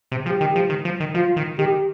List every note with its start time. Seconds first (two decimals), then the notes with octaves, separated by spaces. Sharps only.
0.12 C3
0.26 F3 G4
0.41 D#3
0.56 F3
0.70 D#3
0.85 F3
1.00 D#3
1.14 F3 F4
1.36 D#3
1.58 D#3 G4